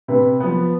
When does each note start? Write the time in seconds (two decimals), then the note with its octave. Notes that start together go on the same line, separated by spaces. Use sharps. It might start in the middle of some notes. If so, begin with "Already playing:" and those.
0.08 C3 B4
0.40 F3 B3